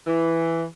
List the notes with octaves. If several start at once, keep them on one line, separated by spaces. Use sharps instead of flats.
E3